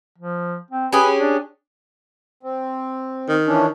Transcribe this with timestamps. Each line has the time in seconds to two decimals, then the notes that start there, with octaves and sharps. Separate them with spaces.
0.18 F3
0.71 C4
0.93 C#4 G4 G#4 B4
1.16 D4
2.43 C4
3.28 D#3
3.47 E3 C#4 D4